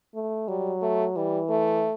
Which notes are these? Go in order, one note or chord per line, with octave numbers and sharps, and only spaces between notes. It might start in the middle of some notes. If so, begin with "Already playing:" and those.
A3
F#3 G3
A3
E3 G3
A3